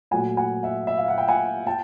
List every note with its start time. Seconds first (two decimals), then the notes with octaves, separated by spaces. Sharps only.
0.11 A#2 F#3 A3 F#5 G#5
0.37 F#5 G#5
0.63 E5 F#5
0.87 E5
0.98 F5
1.08 F#5
1.18 G5
1.28 F#5 G#5
1.67 G5 A5